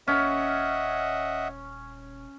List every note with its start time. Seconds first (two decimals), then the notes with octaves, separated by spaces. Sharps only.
0.08 D#1 C#4 D#5 E5 F#5